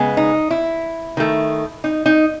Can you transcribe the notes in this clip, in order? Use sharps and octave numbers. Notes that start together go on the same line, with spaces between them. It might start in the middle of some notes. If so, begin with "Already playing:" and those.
Already playing: C#3 G#3 B3
D#4
E4
D#3 A3
D#4
D#4